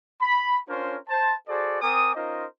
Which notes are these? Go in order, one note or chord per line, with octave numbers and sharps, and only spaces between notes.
B5
C#4 D4 F4 A#4 C5 C#5
C5 A5
F#4 G#4 A4 C5 D5
C4 A#4 G#5 D6 D#6
C#4 D#4 F4 A#4 C5 D#5